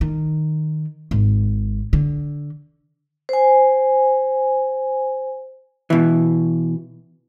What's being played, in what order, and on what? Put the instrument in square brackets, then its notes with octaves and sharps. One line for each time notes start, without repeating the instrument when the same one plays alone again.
[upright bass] D#3
G#1
D3
[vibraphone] C5 G#5
[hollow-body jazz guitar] B2 E3